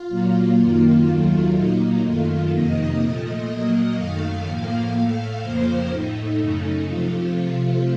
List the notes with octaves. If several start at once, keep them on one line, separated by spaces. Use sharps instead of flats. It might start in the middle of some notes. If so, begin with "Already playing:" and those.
Already playing: F4
A#2 F#3 A#3
F#2 D#3 A#3
D#2 D#3 F#3 A3
A#2 F#3 A#3 D#4
F#2 D#3 A3 F4
F2 C3 D#3 A#3 D#5
A#2 F3 A3
A#2 F#3 A#3
F#2 D#3 A3 F5
A2 F3 A#3 F5
A2 A3
F2 C#3 F3 A#3 C5
A2 A3 D#4
F#2 C#3 A3 D#4
C3 F3 A3 F4
C3 F3 A3